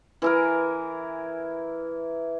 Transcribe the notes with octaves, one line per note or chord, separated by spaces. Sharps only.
E3 E4 A#4